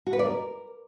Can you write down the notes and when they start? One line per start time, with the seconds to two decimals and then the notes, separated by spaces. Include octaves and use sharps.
0.07 F#4
0.13 B4
0.19 D5
0.26 A#4